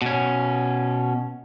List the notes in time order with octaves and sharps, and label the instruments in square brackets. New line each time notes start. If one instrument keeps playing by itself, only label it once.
[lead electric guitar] B2 C#4